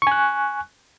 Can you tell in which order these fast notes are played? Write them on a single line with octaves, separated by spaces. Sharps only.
C#6 G#5 F#6